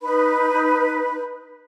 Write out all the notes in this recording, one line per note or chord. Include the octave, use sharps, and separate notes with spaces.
D#4 B4 B5